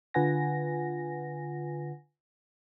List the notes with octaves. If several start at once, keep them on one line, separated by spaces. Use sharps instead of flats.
D3 F4 B4 F#5 G#5 A#6